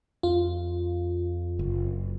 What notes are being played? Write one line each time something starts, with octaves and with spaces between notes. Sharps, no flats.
F2 F4
F#1